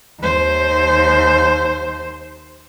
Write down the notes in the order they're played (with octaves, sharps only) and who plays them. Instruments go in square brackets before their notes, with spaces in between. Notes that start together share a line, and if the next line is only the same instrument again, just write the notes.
[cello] D#2 C5